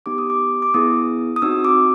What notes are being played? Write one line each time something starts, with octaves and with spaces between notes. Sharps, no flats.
B3 D#4 G4 D6
D#6
D6
D6
B3 E4 G#4 D#6
D#6
C4 D#4 F#4 E6
D6